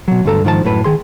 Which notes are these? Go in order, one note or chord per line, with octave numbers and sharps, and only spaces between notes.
B2 F#3
D2 G2 A4 A#5
G#2 D#3 F3 A4 A5
F#2 A2 B4
D#3 G#4 C6